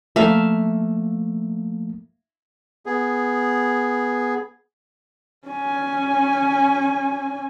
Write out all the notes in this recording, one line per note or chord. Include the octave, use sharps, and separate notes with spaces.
F3 A3 A#3 E5 F5
B3 G#4
C#4 G#5